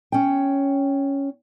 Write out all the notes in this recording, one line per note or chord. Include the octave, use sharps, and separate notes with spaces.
C#4 G5